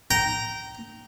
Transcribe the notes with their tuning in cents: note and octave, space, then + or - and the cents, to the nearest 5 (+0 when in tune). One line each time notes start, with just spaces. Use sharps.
G5 -20 A#5 +0